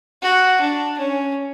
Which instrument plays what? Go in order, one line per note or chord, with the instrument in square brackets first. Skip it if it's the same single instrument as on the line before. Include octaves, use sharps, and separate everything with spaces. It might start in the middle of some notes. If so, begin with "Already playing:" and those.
[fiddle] F#4
D4
C#4